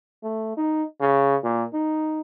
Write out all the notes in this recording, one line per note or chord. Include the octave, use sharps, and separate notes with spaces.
A3
D#4
C#3
A#2
D#4